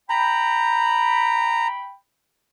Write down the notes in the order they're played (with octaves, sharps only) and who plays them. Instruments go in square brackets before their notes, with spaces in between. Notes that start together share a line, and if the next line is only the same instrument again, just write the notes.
[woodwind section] G5 B5 [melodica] A#5